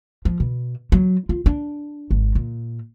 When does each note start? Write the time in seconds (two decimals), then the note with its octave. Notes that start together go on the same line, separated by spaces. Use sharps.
0.25 F3
0.40 B2
0.92 F#3
1.29 F4
1.46 D4
2.11 G#1
2.35 A#2